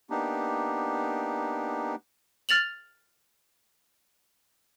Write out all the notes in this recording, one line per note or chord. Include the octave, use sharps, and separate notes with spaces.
A#3 B3 D4 D#4 G4
F6 A6 F7 F#7